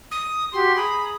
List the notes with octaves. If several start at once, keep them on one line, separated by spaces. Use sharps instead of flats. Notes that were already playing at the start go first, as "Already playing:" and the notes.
D#6
F#4 G4 C6
G#4 A#5 B5 D#6